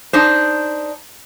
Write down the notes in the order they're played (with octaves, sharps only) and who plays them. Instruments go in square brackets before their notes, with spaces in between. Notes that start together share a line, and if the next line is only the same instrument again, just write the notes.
[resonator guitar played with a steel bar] D4 D#4 C5